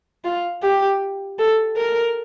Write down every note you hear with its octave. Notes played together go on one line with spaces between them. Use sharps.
F4
G4
A4
A#4